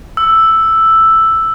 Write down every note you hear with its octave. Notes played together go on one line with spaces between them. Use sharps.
E6